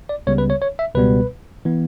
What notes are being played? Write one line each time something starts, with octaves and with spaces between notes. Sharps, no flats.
D5
C#2 C#3 G3 B3 C#5
B4
C#5
C#5
E5
C#2 B2 G3 B3 B4
E3 B3